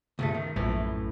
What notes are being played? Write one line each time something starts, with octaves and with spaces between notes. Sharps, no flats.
C#2 G2 A3
D#3
A#1 F#2 A2 E3